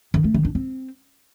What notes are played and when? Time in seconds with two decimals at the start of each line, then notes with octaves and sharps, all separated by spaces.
0.14 D#3
0.24 A3
0.34 D#3
0.45 D4
0.55 C4